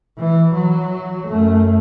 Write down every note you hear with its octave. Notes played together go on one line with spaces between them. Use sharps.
E3
F#3
F#2 A3